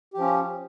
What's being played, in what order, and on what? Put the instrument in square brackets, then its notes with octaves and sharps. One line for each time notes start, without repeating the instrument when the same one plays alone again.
[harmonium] G4
F3
C#4